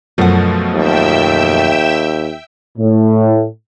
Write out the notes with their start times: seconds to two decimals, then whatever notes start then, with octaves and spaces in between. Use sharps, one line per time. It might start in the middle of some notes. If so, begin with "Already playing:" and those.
0.18 F#2 B2 F3 A3 F#5
0.75 D#2 E5 G5 E6
2.78 A2